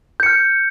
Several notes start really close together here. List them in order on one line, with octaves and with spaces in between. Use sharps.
G6 C#7 F6